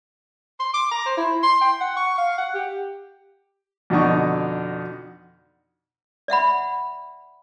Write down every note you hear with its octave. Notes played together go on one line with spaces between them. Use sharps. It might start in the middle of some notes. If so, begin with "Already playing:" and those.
C6
D6
A#5
C5
E4
C6
G5
F#5
C#6
F5
F#5
G4
F2 B2 D3 D#4 C#6
D5 E5 F#5 B5